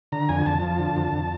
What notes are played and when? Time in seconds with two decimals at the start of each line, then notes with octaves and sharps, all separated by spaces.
0.12 D3 A#5
0.29 F2 G#5
0.46 F2 A5
0.62 F3
0.79 D3
0.96 F2
1.12 F2